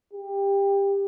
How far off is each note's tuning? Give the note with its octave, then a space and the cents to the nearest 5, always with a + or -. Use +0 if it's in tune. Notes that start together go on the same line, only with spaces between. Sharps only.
G4 +20